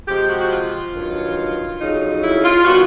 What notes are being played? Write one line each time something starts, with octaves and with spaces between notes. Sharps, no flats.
C3 F3 G#3 G4
F#4
F#4
F4
G2 D#3 F#3
F2 C#3 F#3 D#4
E4
F4
D#3 G3 B3 F#4